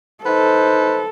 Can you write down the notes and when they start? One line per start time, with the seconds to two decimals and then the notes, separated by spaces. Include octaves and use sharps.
0.24 D#4 A4 B4 C5